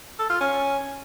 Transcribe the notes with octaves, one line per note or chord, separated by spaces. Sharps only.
A4
F4
C#4